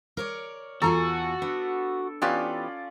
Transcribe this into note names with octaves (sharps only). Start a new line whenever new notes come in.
A#4 C#5 D5
E2 F4 F#4 A4 G#5 A#5
B3 D4
E3 B3 C#4 F4 G4 D5